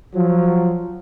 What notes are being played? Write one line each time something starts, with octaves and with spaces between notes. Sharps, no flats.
F3 F#3